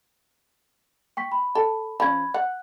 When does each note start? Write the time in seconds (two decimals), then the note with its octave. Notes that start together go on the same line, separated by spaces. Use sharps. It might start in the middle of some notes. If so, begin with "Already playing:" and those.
1.17 G5 C#6 B6
1.32 B5
1.55 A4
2.00 F3 C#4 B5 G#6
2.34 F#5 F#6